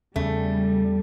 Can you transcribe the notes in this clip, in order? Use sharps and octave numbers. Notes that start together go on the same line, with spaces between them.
E2 C#3 G3 A3